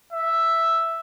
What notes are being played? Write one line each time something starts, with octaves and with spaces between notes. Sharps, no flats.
E5